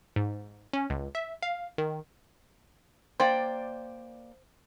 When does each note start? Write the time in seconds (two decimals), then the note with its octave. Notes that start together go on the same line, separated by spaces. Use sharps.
0.16 G#2
0.73 C#4
0.90 C#2
1.15 E5
1.43 F5
1.78 D#3
3.20 A#3 C5 D5 G5